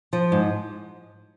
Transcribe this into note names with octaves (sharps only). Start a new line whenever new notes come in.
F3
G#2